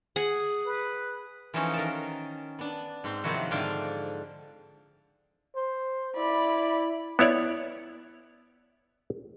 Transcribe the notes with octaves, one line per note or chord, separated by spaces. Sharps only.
G#4 F#5
B4
E3 F3 A3 C#4 D#4 F#4
D#3 A#4 A5
B3 D4
G#2 C4 C6
C3 D#3 F3 F#3 E4 F#4
G#2 D3 D4 F5 G5
C5
E4 D5 B5
B3 E4 C#5 D5